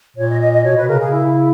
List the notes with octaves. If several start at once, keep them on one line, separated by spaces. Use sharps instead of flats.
A#2 C#5
D#5
D#5
D#5
B2 C#5
B2 B4
C#3 A#4
C#3 G#4
E4